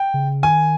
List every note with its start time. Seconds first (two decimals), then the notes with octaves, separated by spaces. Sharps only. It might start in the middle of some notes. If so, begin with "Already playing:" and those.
Already playing: G5
0.14 C#3
0.43 D#3 G#5